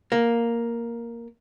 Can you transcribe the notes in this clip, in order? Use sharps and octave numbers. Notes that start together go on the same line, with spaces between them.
A#3